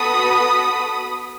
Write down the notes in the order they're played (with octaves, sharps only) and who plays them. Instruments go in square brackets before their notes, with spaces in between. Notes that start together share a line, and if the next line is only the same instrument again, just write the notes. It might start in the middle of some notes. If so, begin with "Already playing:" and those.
Already playing: [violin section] B3 F#4 A4 B5 D#6